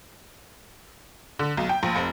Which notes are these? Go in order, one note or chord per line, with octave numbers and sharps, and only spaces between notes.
D3
B1
G5
A#1
F1